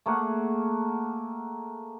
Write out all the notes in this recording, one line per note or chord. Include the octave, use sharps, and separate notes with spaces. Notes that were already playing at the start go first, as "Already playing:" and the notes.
A3 A#3 G#4 F#5